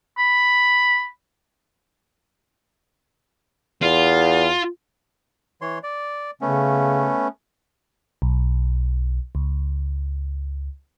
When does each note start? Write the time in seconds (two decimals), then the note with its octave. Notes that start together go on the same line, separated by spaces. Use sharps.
0.18 B5
3.82 E2 F4
5.62 E3 C#5 C6
5.83 D5
6.41 C#3 A3 B3 C#4
8.22 B1
9.35 C#2